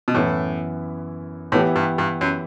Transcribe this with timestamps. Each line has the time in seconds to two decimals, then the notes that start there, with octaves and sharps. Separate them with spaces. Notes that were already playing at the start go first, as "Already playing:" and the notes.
0.08 B2
0.14 F#2 A2 E3 B3 E4
1.52 A2 E3 B3 E4 G4
1.76 G2
1.98 G2
2.21 F#2